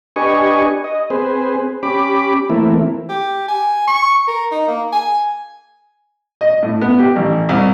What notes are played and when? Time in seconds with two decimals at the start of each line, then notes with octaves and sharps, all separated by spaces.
0.16 D4 G4 B4 D#5 G#5 C#6
0.84 D#5
1.10 C4 G#4 B4 C5
1.83 C#4 G4 B5 D6
2.50 E3 A3 A#3 C4 E4
3.09 G4
3.48 G#5
3.87 C#6
4.27 A#4
4.51 D#4
4.68 A#3
4.92 G#5
6.41 D#5
6.62 A2
6.81 B3
6.99 G4
7.16 A1
7.49 C2